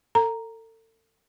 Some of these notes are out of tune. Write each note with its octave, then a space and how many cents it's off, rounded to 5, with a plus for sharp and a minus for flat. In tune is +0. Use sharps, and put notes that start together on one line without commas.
A4 +35 A#5 +0